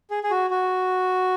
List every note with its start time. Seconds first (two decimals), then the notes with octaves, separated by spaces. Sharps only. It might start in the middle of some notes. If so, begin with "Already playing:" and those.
0.10 G#4
0.23 G#4
0.31 F#4
0.50 F#4